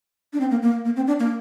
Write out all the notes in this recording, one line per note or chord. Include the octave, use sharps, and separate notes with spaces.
D4
C4
A#3
A#3
A#3
C4
D4
A#3